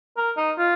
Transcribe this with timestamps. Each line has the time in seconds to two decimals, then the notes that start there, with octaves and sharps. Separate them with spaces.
0.17 A#4
0.37 D#4
0.58 F4